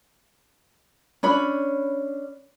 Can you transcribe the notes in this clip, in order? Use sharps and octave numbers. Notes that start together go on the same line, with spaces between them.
C#4 D4 B5